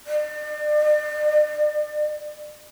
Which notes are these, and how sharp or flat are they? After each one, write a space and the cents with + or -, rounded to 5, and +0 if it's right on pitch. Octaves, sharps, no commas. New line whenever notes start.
D5 +40